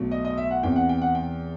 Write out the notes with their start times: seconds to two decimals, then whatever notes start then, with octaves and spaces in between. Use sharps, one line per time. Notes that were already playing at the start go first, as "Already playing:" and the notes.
Already playing: B1 B2 A3
0.11 D#5
0.25 D#5
0.38 E5
0.51 F#5
0.63 E2 C3 E3 G5
0.76 F#5
0.89 G5
1.02 F#5
1.15 G5